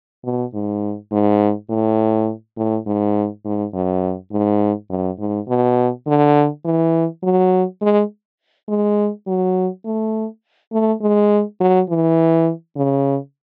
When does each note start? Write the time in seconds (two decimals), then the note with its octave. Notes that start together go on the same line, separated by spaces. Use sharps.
0.24 B2
0.54 G#2
1.11 G#2
1.70 A2
2.57 A2
2.86 G#2
3.45 G#2
3.74 F#2
4.32 G#2
4.90 F#2
5.19 G#2
5.48 B2
6.07 D3
6.65 E3
7.23 F#3
7.82 G#3
8.68 G#3
9.27 F#3
9.85 A3
10.72 A3
11.01 G#3
11.60 F#3
11.89 E3
12.76 C#3